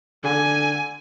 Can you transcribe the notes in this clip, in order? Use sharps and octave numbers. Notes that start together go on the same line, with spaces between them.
D3 G#5